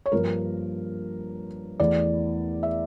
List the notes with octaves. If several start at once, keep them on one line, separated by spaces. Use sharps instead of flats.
C#5
G2 F3 A#3 A#4
E2 E3 A3 D5
E5